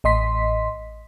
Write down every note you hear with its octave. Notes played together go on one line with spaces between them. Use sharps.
A1 D#5 C6 B6